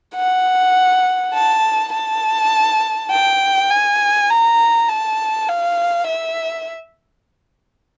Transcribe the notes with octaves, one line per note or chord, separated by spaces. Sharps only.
F#5
A5
A5
G5
G#5
A#5
A5
F5
E5